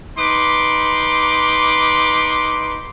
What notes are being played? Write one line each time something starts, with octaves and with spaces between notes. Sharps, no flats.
D#4 B4 C6 D6